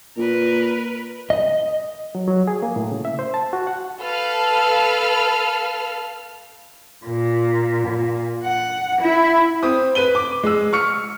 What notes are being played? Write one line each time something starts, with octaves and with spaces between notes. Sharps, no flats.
A#2 A#4 B4
D#5
F#3
F#3
G#4
A#3
A2
C#3
E5
C5
A5
F#4
F#5
A4 B4 F5 F6
A#2
A#2
F#5
E4
C4 D#6
B4 D#7 G7
D6
G#3 E6
C#6 F6 C#7